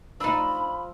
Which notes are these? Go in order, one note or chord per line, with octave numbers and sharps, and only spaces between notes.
F3 D4 D#4 B5 E6